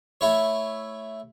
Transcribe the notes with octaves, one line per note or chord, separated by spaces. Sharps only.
A3 E4 C#5